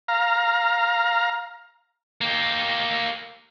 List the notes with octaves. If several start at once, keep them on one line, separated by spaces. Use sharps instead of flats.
F5 A#5
A#3 G4